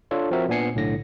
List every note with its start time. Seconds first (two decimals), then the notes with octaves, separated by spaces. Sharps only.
0.11 D4 F4 A4 C#5
0.31 F3 C4 F#4 A#4 E5
0.49 A#2 B3 D4 G#5 C7 C#7
0.75 B1 A2 D3 A#6